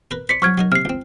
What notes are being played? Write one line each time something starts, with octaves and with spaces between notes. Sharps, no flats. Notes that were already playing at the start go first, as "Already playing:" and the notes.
A#4 B4
C5 D5 B6 C#7
F3 F#3 C#6 F6 G#6
F#3 D#4 A#4
C3 F6 C7
C#2 C4